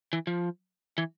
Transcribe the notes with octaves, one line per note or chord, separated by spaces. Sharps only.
E3
F3
E3